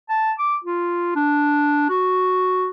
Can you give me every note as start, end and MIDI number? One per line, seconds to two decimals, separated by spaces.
0.10 0.32 81
0.39 0.56 86
0.64 1.15 65
1.16 1.86 62
1.90 2.68 66